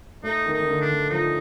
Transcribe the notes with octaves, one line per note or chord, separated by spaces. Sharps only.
A3 D#4
D#3
D#4
D#3
D3
D4
D#3
F3 D#4